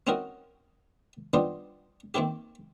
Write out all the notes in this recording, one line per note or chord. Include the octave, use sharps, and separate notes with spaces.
C4 C#4 D#4 E4 F#4 A#4
G3 B3 D4 D#4 F4 C5
D#3 A#3 C4 E4 G4